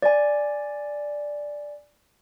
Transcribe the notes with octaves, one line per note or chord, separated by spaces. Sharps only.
D5 G#5